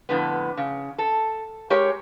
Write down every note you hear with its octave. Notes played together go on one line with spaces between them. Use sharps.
F2 A2 D3 B3
C#3
A4
G#3 G4 A#4 C#5